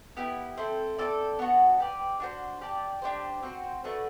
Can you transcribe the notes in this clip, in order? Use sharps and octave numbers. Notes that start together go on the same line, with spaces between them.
B3 E4 G4
C4 E4 A4
C4 F#4 A4 D5
B3 D4 F#4
G4 B4 D5
D4 F#4 C5
G4 D5 A5
D4 G4 C5
C4 F#4 C5
A3 D4 F#4 B4